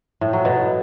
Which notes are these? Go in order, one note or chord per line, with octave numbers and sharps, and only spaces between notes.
A2
F#3
B2